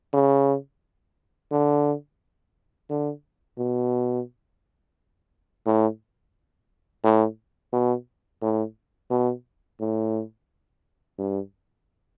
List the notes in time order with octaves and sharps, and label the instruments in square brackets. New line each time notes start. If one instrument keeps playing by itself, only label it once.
[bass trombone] C#3
D3
D3
B2
A2
A2
B2
A2
B2
A2
G2